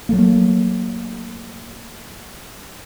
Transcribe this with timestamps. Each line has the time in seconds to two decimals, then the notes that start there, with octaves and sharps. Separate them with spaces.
0.09 F#3 A3 A#3